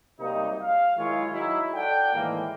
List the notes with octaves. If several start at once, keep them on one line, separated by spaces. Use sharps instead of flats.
C3 F#3 G3 A#3 D#4
F5
D#3 F#3 G#3 E4 F4 C#5
F#3 D#4 E4
A4 D5 F#5 G5
A2 D#3 E3 G#3 A#3